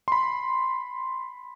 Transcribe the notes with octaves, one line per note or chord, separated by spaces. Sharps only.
B5 C6